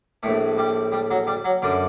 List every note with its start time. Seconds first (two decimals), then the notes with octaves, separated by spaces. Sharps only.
0.23 A#1 A2 A3
0.58 G3
0.92 G3
1.11 F#3
1.27 G3
1.45 F#3
1.62 F#2 D3 G3